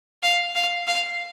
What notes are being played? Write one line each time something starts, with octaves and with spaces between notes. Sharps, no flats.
F5
F5
F5